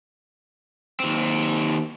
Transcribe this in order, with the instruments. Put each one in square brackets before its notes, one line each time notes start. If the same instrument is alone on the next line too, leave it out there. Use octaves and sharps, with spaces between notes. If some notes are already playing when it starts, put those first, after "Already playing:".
[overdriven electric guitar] D#2 C4